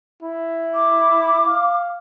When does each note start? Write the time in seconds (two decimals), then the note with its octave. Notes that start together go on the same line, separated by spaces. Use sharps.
0.22 E4
0.75 D6
1.47 F5